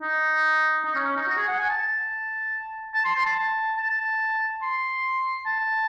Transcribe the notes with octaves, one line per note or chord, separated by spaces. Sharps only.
D#4
D#4
C#4
C#4
D#4
F#4
G#4
F#5
G#5
A5
A5
C6
C6
A5
A5
C6
A5